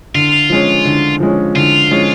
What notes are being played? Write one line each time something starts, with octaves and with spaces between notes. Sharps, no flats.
D3 F4
F3 G#3 C#4
D3
F3 G#3 C#4
D3 F4
F3 G#3 C#4